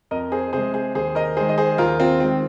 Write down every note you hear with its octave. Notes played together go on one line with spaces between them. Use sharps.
F2 A#4 D#5
G#4 C5
C3 G#3 G#4 C5
G#4 C5
D#2 G#4 C5
A#4 D#5
D#3 G#3 G#4 C5
D#5
G#4 C5
D#2 F4 A#4
C4 F4
D#3 G#3 C4